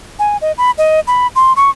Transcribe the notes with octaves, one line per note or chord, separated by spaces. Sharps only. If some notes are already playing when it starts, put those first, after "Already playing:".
G#5
D#5
B5
D#5
B5
C6
C#6